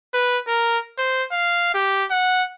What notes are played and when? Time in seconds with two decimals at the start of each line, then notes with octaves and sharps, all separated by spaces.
0.14 B4
0.48 A#4
0.98 C5
1.32 F5
1.74 G4
2.11 F#5